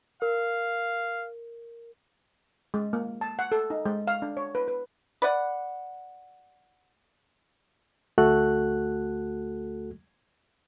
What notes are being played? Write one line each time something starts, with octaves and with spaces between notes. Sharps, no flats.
A#4 F5
G#3
A#3
A5
F#5
A4
D#4
G#3
F5
D4
C#5
B4
B4
B4 D5 F#5
D2 A3 F#4 A4 F#6